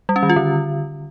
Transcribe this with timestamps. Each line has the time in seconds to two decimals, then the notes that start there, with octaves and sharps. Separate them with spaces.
0.09 G3
0.16 C#4
0.23 D#3
0.30 F4
0.36 D3